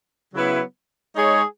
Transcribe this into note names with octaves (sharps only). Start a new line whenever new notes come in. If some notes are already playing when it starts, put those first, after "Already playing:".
C#3 F#3 B3 E4 B4
G#3 D#4 G#4 C#5